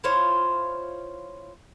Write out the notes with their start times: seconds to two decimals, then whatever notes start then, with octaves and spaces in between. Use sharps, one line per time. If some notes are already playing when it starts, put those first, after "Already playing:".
0.04 E4 F4 C5 C#5